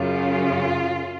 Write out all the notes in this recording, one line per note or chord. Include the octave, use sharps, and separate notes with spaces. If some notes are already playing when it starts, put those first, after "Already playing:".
Already playing: F#2 C#3 F#3 F4